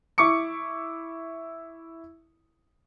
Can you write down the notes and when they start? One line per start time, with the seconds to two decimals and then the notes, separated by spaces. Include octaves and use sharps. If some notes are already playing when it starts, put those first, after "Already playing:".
0.18 E4 C#6 D6 C#7